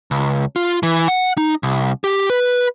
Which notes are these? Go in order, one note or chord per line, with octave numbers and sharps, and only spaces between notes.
C#2
F4
E3
F#5
D#4
C2
G4
B4